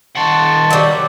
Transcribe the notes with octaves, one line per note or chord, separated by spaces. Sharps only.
D#3 F#5 A5 C6 C#6
F#3 G3